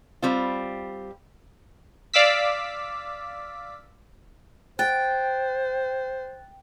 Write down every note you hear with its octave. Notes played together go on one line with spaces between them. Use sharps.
G3 C4 F4
D5 F5 D6 E6 B6
C5 G5 F#6 A6